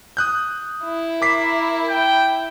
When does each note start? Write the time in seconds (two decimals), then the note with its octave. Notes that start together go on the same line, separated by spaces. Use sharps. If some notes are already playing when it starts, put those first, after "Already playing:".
0.17 D#6 F#6 G6
0.84 E4
1.22 A#4 D6 B6 C7
1.88 G5